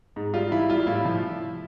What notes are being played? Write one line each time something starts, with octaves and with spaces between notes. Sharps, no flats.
G#2
G3 F4
E3 E4
G3 F4
A2 E4
F3